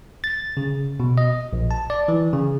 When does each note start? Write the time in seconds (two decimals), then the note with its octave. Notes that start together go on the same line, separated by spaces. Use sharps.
0.24 A6
0.57 C#3
1.00 B2
1.18 D#5
1.53 A#1
1.71 A5
1.90 D5
2.08 E3
2.33 C#3